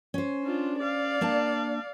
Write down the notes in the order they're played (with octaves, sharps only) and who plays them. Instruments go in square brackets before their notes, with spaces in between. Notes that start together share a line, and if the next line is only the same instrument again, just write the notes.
[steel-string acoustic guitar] C#4 C5
[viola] D4 F4
D5 F5
[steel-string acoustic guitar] A#3 D4 A5